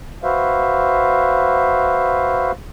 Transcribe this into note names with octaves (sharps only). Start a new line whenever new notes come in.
F#4 B4 C5 E5 F5